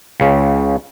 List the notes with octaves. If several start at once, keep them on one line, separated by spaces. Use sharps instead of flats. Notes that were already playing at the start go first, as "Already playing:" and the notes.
C#2 C#3